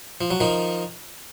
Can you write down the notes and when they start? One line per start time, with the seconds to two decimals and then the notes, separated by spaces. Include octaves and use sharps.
0.21 F3
0.31 F#3
0.40 D#3 F3